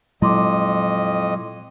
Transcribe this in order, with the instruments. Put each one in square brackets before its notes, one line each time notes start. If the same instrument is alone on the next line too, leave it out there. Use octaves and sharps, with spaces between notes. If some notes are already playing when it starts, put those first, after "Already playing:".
[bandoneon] F2 D#5 [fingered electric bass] A#2 F#3 G#3 [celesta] E4 C6 D6